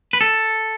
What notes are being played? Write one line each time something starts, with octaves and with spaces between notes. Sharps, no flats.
B4
A4